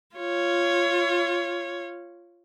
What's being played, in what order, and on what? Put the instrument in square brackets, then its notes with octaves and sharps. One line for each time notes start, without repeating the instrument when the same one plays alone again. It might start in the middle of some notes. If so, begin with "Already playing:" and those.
[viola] F4 C#5